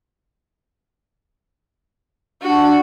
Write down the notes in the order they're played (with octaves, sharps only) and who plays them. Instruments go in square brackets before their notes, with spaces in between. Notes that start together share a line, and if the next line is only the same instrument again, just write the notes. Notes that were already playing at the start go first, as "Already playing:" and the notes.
[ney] D4 [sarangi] F#4